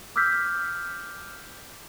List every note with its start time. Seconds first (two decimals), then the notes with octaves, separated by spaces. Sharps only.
0.16 D6 E6 F6 G6 B6